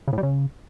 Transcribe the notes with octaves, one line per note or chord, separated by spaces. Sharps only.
C#3
A2
G3
C#3